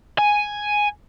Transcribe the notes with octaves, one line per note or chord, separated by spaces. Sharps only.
G#5